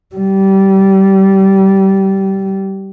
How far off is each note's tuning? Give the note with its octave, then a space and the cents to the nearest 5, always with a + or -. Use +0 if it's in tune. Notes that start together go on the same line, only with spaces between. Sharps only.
G3 -20